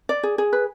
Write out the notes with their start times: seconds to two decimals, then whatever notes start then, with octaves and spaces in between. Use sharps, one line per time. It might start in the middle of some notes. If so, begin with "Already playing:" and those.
0.09 D5
0.23 G#4
0.38 G#4
0.53 B4